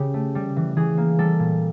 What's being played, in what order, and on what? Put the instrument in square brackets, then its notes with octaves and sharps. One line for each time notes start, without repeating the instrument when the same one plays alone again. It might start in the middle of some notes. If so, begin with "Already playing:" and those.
Already playing: [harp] C#3 G4
A3
G3
E3
E3 G#4
A#3
G3 A4
A#2